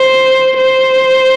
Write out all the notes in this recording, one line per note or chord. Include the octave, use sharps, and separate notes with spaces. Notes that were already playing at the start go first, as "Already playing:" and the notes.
Already playing: C5
C5